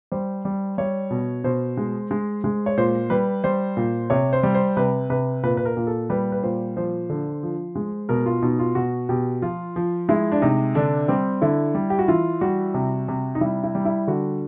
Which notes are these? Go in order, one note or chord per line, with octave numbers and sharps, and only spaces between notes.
G3 C5
G3
G3 C#5
B2
B2 C5
G#3
G#3
G#3
C#5
A#2 C5
G3 B4
G3 C5
A#2
C3 C#5
C5
G3
C5
C3 B4
C3 B4
A#2 B4
B4
A#4
A#2
A4
G3 B4
B4
A#2 C5
F3 C5
D3
F3
G#3
B2 A#4
F4
B2 D#4
F4
B2 F#4
B2 G4
F3 F4
F3
G#3 E4
D4
C3 D#4
D3 D4
G3 C4
D3 E4
G3
G4
F#4
E3 F4
G3 F#4
C3
C3
D#4
G3 E4
E4
G3
E4
D3 F#4